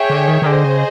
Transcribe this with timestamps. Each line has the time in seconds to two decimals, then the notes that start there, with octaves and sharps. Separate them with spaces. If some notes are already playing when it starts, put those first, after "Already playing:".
Already playing: G#4 C#5 E5 G5
0.10 D3
0.28 D#3
0.42 D#3
0.46 D3 G#4 C5 D#5
0.65 C#3